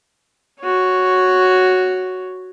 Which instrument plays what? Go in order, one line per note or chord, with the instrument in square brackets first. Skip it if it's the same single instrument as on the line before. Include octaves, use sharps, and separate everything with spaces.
[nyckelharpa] F#4 C#5